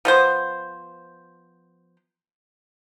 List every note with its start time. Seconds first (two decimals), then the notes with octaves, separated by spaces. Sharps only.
0.05 F3 B3 C5